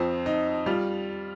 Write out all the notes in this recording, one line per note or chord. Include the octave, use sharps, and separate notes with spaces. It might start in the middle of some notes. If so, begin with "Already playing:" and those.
Already playing: F2 F3 C4
D#4
G3 F4